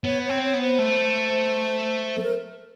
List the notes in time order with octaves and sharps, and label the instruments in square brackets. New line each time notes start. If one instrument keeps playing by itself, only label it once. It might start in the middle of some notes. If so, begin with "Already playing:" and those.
[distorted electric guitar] B3 [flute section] C#5
[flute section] C#5
[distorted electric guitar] C4
[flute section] C#5
[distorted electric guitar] B3
[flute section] C5
[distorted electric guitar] A3
[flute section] A4
A#4